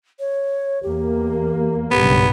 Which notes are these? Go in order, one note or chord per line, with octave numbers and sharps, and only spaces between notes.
C#5
E2 A#3 G4
B1 G2 C#3 B3 G4